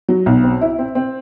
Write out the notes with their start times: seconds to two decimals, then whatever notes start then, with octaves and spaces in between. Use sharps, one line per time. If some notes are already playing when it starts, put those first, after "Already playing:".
0.09 F#3
0.26 B1
0.44 C4
0.61 E4
0.79 C4
0.95 C4